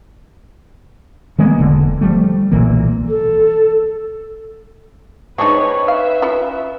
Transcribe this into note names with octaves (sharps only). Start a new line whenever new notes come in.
D#3 G#3 A#3 B3
E1 D3
F3 G3 A3
B1 A#2 E3 A#3
A4
E3 G#3 C4 D4 D#4 B4 C#5 C#6
B4 E5 F5
C#4 E4 F4